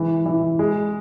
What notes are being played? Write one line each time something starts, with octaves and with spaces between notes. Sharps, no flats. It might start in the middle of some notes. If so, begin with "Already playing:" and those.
Already playing: E3 G#3
E3
G#3